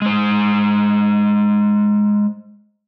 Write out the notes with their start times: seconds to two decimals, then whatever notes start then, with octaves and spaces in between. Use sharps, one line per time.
0.02 G#3 C5